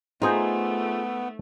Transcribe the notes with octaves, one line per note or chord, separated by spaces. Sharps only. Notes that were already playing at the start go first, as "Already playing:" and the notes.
A3 B3 D#4 F4 G#4 C5 D#5